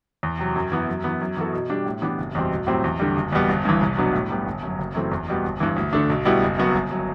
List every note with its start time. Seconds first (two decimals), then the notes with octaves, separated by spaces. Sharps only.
0.23 E2
0.39 C3 F#3
0.56 F#2
0.72 E3 B3
0.88 F#2
1.04 E3 B3
1.21 F#2
1.37 E3 B3 F#4 A4
1.53 B2
1.70 G3 D4 G4
1.86 A2
2.02 E3 B3 D4 G4
2.18 F#1
2.35 E2 B2 G3 C4
2.51 B1
2.67 A2 F#3 C4 G4
2.84 E2
3.00 D3 G3
3.16 F#1
3.33 E2 B2 G3 B3
3.49 G1
3.65 G2 E3
3.81 C2
3.97 B2 F#3 B3 D4
4.13 A2
4.30 G3 B3
4.46 G1
4.63 F#2 F#3
4.79 F#1
4.95 F#2 E3 A3 C4
5.12 E2
5.28 B2 G3 B3
5.44 G1
5.60 G2 E3
5.76 D2
5.93 D3 A3 D4
6.10 B1
6.25 B2 G3 B3 E4
6.42 F#1
6.58 F#2 F#3 B3 F#4
6.74 G1
6.91 F#3